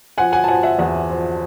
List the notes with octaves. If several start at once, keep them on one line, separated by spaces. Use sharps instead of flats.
F3 F#5 G#5
F#5 G#5
A5
F3 F#5 G#5
E5 F#5
E2 E5 F#5
F3